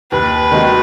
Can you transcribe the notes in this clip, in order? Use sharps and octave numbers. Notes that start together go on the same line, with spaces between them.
D#2 B4
D#3 G#3 D#4 F#4